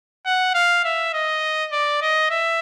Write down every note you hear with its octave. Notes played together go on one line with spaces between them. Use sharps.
F#5
F5
E5
D#5
D5
D#5
E5